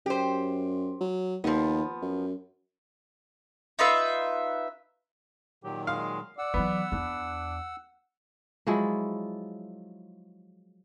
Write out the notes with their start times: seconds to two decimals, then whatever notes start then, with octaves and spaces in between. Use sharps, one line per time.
0.06 F#2 G4 C5
1.01 F#3
1.44 D#2 F3 B3
2.02 F#2
3.79 D#4 F4 B4 E5
5.64 A#2 D#3 F#3 G4
5.87 G#3 F5
6.38 D5 F#5 E6
6.54 E3 F#3 B3
6.92 E2 D4
8.67 F3 F#3 G#3 E4